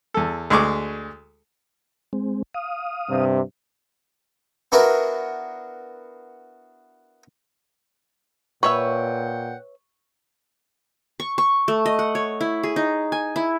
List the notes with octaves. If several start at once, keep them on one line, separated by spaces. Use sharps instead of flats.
E2 A4
D2 G#3 G#4 C#6 D6
G#3 C4
F5 D#6
G2 C3
B3 D4 E4 F#4 A#4
A#2 B4 C#5 E5 F#5 G5 C#6
C#6
C#6
A3
D#5
F#5
C#5
E4
G#4
D#4
G#5
E4